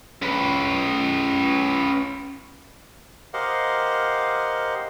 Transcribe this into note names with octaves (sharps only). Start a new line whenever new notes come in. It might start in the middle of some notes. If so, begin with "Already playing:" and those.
C#4 B4
G4 A#4 C5 D#5 F5 F#5